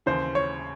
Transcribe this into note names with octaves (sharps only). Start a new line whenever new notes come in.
D#2 C#3 E3 C5
C#5